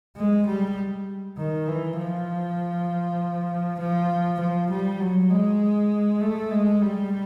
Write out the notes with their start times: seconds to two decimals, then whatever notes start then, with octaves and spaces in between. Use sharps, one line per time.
0.16 G#3
0.46 G3
1.37 D#3
1.67 E3
1.98 F3
3.79 F3
4.40 F3
4.70 G3
5.00 F#3
5.30 G#3
6.21 A3
6.51 G#3
6.81 G3